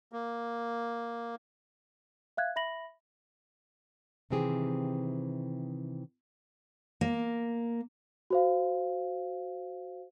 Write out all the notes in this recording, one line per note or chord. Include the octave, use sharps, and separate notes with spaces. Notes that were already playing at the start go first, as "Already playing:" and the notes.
A#3
E5 F5 F#6 G#6
E5 B5 A#6 F#7
C3 D#3 E3 C4 G4 G#4
A#3
F#4 C5 F5